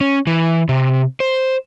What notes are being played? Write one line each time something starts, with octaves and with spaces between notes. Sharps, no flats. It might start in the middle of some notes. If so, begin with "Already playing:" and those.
C#4
E3
C3
C5